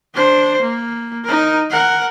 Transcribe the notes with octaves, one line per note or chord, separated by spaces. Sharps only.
D4 C5
A#3
D#4 A#4
A#4 F#5